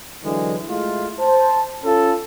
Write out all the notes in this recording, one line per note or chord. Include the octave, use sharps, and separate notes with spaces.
D3 E3 F#3 G#3
G#3 A3 E4 F4
C5 A5
C#4 F4 A4